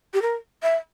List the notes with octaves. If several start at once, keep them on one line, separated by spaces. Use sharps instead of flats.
G4
A#4
E5